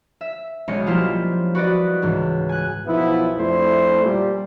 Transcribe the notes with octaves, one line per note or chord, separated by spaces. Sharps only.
E5
B1 G#3 C#4 D#5 C#7
F3 G3 A#3 E4 F4 G4
F#4 B4 D5 D#5
C#2 G#2 E3
G#5 F#6
B1 F3 B3 E4
F2 A3 D4 E4 C5
A#2 G3